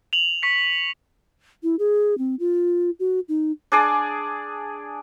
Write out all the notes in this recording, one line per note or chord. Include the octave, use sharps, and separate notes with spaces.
F7 F#7
C#6 B6 C#7
E4
G#4
C4
F4
F#4
D#4
D4 G#4 D5